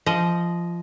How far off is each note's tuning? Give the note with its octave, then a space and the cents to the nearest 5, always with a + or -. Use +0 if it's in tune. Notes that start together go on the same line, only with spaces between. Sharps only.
F3 -20 D#5 +0